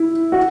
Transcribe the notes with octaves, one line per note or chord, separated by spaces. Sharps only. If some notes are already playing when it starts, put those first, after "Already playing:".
Already playing: E4
F#4